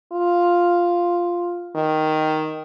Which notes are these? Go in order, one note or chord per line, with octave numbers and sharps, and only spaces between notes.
F4
D#3